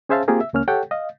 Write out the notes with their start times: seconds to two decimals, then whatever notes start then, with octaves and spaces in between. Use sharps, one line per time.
0.09 C#4 G#4 C5 E5 F5 A5
0.28 A#3 C4 F4 G4 G#4 A#4
0.41 E5
0.53 C#2 A#3 C#4 F6
0.68 G4 A4 C#5 F#5 G5
0.91 D#5 F5